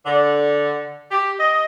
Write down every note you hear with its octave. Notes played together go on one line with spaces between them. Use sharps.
D3
G4
D#5